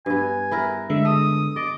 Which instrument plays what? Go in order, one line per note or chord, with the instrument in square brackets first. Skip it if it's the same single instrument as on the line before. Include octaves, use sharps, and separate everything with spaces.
[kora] G2 B3 [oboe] G#5
[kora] B3 E4 A#4
[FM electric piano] D3 G#3 [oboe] E5
[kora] A4 [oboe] D#6
[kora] D#5 [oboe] D6